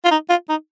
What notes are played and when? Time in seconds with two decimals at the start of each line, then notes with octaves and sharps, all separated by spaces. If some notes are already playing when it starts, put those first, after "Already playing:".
0.05 F4
0.11 D#4
0.29 F4
0.49 D#4